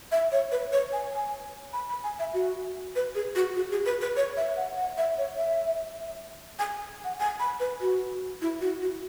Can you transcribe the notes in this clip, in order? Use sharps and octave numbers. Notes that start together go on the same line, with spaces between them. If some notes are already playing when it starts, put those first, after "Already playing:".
E5
C#5
B4
C#5
G#5
G#5
B5
B5
G#5
E5
F#4
B4
G#4
F#4
F#4
G#4
B4
B4
C#5
E5
F#5
F#5
E5
C#5
E5
G#5
F#5
G#5
B5
B4
F#4
E4
F#4
F#4